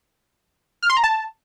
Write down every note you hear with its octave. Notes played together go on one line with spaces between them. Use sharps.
F6
C6
A#5
A5